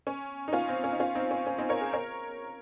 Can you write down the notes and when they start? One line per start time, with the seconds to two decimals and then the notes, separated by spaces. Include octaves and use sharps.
0.07 C#4
0.48 D#4
0.53 C#4 F4
0.68 C4
0.84 C#4
0.92 D#4
1.00 C#4 F4
1.15 C4 D#4
1.31 C#4
1.47 C#4
1.58 C4 D#4
1.69 A#4 C#5
1.81 G#4 C5
1.93 A#4 C#5